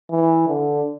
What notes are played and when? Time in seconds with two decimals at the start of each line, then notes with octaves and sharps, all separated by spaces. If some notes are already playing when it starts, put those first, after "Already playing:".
0.11 E3
0.48 D3